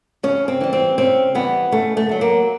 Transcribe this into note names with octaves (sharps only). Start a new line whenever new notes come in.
C#3 C#4
C4
E3 G3
C4
C#3 C4
E3 G3 B3
C#3 A3
A3
F#3 A3
A#3